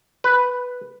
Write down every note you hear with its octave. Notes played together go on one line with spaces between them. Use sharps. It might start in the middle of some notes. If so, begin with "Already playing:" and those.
B4